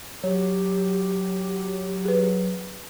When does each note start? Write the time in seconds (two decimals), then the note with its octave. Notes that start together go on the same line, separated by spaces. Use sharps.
0.23 F#3 G4 C#5
2.05 G#4 B4